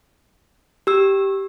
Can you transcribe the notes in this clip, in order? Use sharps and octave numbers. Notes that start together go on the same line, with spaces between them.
G4 E6